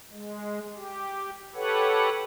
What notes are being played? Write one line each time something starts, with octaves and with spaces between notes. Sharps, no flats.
G#3
G4
G4 A4 B4 C#5 F#5